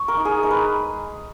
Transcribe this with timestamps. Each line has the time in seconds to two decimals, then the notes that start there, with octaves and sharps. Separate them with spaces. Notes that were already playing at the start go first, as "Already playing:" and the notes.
Already playing: C#5
0.08 A#4
0.17 D#4
0.25 G#4
0.43 G#3 A#4
0.51 B4